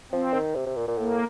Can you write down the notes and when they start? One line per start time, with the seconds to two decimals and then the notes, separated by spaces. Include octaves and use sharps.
0.12 F3 C4
0.34 D#3
0.55 C3
0.66 C3
0.76 A#2
0.88 A#2
0.97 A2 A#3